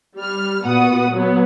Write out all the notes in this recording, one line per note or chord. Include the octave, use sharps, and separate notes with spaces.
G3 F6
A#2 B3 F#4 F#5 D#6
F#3 B3